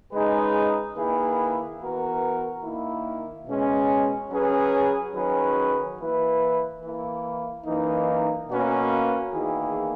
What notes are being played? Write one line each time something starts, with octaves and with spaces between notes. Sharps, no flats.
C#3 G#3 D#4 G#4 B4
D#3 A#3 E4 G#4 B4
E3 B3 F#4 A#4
D#3 A#3 E4
B2 G#3 C#4
F#3 C#4 G#4 B4
D#3 F#3 C#4 G#4 B4
E3 A#3 E4 B4
E3 A#3 E4
F#2 E3 A#3 D#4
B2 A#3 C#4 F#4 B4
E2 D#3 A#3 E4 G#4